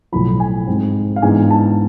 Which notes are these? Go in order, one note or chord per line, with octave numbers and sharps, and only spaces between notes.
B1 A2 F3 B5
G#5
G#2 G#3 C4
F5
G#2 E3 G#3 B3 D4 G#5
A5